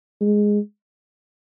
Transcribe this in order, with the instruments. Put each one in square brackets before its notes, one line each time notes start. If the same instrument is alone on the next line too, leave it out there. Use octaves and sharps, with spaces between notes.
[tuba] G#3